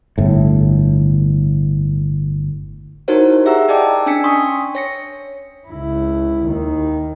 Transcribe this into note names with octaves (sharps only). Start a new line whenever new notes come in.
G1 A2
D#4 E4 F#4 A#4 C5 C#5
G4 G#4 E5 F#5 A#5 E6
D5 D#5 G5 A5 D6 E6
C#4 D4 G#5 E6 B6 C#7
G5 C6 C#6 D#6 B6
C#5 A#6 C#7
C#2 E4
D#2 D#3